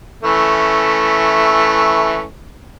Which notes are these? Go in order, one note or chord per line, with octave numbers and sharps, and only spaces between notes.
E3 A3 C#4